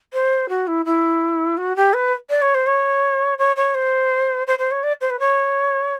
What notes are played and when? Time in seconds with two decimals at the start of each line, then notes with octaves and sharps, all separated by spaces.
0.13 C5
0.49 F#4
0.67 E4
0.85 E4
1.57 F#4
1.76 G4
1.93 B4
2.30 D5
2.42 C#5
2.54 C5
2.66 C#5
3.38 C#5
3.56 C#5
3.74 C5
4.47 C5
4.59 C5
4.71 C#5
4.83 D5
5.01 C5
5.10 B4
5.19 C#5